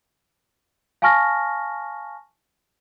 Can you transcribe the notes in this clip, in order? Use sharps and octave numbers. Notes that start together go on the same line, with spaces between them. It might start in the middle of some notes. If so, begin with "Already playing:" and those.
F5 G#5 A5 C#6 F6 A#6